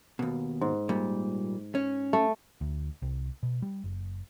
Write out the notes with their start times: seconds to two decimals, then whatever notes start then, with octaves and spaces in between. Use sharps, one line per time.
0.19 D#2 B2
0.61 G#2
0.89 A#2 G3
1.75 C#4
2.13 A3
2.61 D2
3.02 C2
3.43 B2
3.62 G3
3.84 F#1